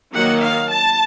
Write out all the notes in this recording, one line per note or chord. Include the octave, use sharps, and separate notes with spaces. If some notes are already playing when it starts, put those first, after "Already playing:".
D#3 F#3 A#3 F#5
F5
A5